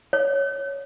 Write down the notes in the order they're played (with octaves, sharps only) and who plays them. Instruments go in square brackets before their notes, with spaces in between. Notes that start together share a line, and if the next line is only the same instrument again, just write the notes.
[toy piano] C#5